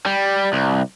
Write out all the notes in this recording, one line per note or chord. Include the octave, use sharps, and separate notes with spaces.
G3
C2